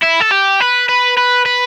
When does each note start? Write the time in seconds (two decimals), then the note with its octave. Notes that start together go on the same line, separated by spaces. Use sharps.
0.03 E4
0.21 A4
0.31 G4
0.61 B4
0.89 B4
1.18 B4
1.46 B4